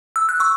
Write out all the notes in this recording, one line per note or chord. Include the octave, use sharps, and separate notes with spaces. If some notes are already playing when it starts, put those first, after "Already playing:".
E6
F#6
C#6 E6